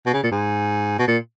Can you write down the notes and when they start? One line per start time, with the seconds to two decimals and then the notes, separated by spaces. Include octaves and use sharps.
0.06 B2
0.13 C#3
0.23 A#2
0.31 G#2
0.99 B2
1.07 A#2